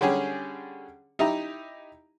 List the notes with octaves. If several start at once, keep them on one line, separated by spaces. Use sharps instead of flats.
D3 G3 C#4 G4 G#4
D#4 E4 G4 A#5